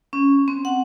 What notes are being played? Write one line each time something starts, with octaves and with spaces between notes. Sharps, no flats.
C#4
C4
F#5